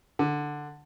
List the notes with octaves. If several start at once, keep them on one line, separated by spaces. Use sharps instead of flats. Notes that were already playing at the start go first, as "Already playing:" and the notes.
D3